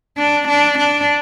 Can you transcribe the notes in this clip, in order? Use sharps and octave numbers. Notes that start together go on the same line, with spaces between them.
D4
D4
D4